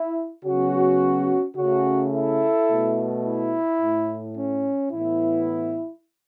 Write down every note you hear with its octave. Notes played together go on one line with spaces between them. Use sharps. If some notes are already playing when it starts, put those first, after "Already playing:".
Already playing: E4
C#3 F#3 B3 C#4 F#4
C#3 A3 C#4 F#4
E4 A4
B2 A3
E4
A2 A3
C#4
A2 E3 B3 E4